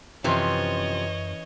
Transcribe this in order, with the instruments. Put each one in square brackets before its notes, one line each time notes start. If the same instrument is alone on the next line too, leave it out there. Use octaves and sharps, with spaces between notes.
[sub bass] F#2 [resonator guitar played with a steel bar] C3 F3 [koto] E3 C#4 [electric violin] C#5 D#5